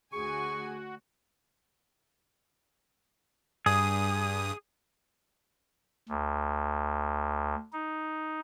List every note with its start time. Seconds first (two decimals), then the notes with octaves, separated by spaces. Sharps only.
0.13 D2 F#4 G#4 G#5 C#6
3.66 G2 G#4 D#6
6.09 D2
7.72 D#4